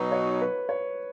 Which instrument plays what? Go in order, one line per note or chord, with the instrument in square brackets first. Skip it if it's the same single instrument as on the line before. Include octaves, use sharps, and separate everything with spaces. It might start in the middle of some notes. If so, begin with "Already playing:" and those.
Already playing: [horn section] B2 F#3 D#4 [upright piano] B4
[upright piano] C#5
B4
C#5